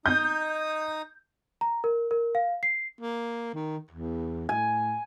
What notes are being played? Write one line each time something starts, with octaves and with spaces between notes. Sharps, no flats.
D#4 D#6 G6
A#5
A#4
A#4
F5
C7
A#3
D#3
E2
A2 G#5